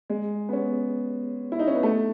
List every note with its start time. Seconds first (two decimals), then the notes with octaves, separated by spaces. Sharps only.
0.10 G#3
0.49 B3
0.53 C#4
1.52 E4
1.59 D#4
1.67 C#4
1.75 B3
1.83 A3